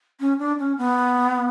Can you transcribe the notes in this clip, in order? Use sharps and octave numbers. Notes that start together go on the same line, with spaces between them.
C#4
D4
C#4
B3